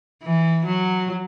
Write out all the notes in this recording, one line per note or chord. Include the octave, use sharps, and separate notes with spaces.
E3
F#3